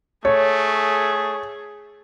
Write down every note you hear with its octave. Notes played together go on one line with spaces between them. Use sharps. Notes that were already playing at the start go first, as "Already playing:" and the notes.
A3 G#4 C#5